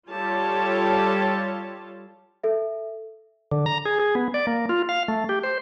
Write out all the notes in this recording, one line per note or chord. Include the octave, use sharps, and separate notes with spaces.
G3 F4 G4 A4 C#5 A5
A4 E5
D3
A#5
G#4
G#4
B3
D5
A#3
F4
F5
A3
G4
C5